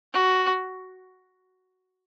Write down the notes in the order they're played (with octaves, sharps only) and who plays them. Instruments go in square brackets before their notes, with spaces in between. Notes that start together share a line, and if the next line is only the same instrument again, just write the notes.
[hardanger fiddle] F#4